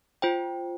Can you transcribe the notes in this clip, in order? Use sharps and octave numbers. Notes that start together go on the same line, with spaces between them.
F4 C5 G5